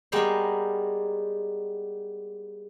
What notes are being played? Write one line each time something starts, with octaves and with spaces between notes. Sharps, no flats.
G3 G#3 A#3 B3 G5 C6